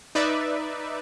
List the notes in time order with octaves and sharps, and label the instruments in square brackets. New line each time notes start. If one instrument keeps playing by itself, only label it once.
[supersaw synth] D#4 B4 D5 E5